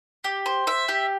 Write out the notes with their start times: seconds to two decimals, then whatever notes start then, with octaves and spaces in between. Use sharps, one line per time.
0.24 G4
0.46 C5
0.67 E5
0.88 G4